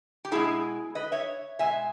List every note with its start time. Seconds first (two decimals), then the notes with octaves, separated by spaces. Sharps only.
0.25 G4
0.31 B2 G#3 E4 G#4
0.95 B4 D#5
1.12 C#5 E5
1.59 B2 G#3 E5 G#5